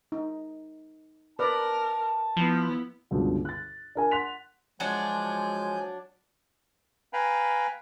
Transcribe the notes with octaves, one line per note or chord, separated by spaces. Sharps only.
D#4
A#4 B4 D5 A5
F3 B3 E4
C#2 G2 B2 D3
F#6 A6
D4 A#4 G#5
F#5 C6 F#6 B6 F7
F3 F#3 G#3 D4 G#5 G6
B4 F5 G5 G#5 A#5 B5